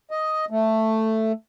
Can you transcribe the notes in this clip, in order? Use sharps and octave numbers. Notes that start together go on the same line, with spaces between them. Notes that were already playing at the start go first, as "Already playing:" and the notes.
D#5
A3